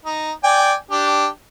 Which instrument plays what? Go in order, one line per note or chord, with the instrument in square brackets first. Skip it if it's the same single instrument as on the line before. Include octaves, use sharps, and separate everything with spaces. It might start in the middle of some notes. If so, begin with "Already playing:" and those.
[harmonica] D#4
D5 G5 G#5
D4 G4